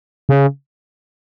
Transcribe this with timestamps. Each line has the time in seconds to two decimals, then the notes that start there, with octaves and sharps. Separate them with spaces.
0.29 C#3